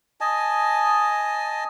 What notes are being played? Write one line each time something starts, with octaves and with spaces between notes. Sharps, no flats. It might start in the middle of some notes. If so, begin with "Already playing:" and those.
D#5 G#5 A5